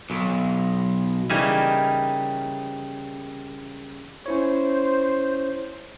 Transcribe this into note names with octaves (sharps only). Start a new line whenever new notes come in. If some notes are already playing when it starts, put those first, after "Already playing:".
B1
C#3 E3 G3 A#3 C#4 D#4
C#4 E4 C5 C#5